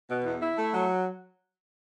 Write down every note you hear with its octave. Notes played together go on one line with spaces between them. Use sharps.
B2
E2
E4
A3
F#3